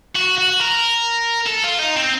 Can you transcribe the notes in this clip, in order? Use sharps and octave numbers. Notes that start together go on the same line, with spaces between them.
F#4
F#4
A#4
A4
F4
D#4
C4